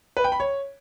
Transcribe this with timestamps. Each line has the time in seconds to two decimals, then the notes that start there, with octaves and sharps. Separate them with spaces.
0.17 B4
0.24 G5
0.32 B5
0.40 C#5